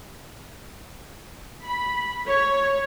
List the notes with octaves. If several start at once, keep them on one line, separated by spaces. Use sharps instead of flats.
B5
C#5